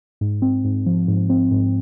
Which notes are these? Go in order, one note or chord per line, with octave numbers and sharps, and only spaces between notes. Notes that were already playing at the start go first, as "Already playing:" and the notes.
G#2
C4
G#2
F3
G#2
C4
G#2